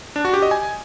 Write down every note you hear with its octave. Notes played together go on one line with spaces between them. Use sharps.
D4
F#4
G4
D#5
G#5